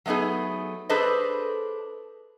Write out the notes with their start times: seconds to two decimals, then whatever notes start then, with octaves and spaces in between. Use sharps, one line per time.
0.06 F#3 A3 B3 D#4 G#4
0.89 D4 G#4 A4 B4 C5 D#5